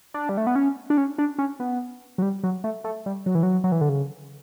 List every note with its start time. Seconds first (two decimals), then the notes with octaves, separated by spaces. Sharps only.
0.14 D4
0.29 G3
0.38 A3
0.47 B3
0.56 C#4
0.90 D4
0.98 C#4
1.18 D4
1.38 C#4
1.60 B3
2.18 F#3
2.22 G3
2.43 F#3
2.64 A3
2.84 A3
3.06 G3
3.26 F#3
3.35 E3
3.43 F#3
3.64 F#3
3.72 E3
3.81 D3
3.89 C#3